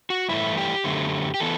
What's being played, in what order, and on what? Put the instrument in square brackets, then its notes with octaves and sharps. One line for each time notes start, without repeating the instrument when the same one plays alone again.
[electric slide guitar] F#4
G2 E3 A3 E4
G4
F#2 D3 A3
G4
E3 B3 A4